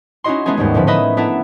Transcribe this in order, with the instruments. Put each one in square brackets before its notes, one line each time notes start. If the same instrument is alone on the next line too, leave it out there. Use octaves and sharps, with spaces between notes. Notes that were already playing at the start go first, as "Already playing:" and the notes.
[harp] C#4 D#4 E4 F#4 D#5 C6
G#3 A3 B3 C#4 D#4 G#4
D#2 G#2 G3 A3
A2 D3 F3 B4
C#4 D#4 B4 D#5 E5 B5
B3 D4 E4 A4 E5 A#5